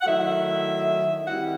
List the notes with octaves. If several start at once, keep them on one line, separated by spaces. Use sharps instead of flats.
F#5
D#3 F#3 A3 E4 E5
D#3 G3 C4 E4 F#5